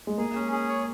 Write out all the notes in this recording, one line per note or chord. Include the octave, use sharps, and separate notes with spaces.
G#3
A#3 G#4
C#4
G#4
C#5